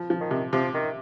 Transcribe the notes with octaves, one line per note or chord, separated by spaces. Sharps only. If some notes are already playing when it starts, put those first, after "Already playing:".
Already playing: F3
F3
D#3
C3
C3 F3
D#3